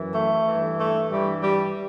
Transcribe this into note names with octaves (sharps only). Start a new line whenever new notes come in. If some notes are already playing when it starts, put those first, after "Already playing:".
Already playing: F#2 E3
A3
G2 E3
A3
G2 E3 G3
G3